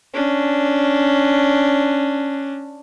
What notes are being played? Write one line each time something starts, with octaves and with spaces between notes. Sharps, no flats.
C#4 D4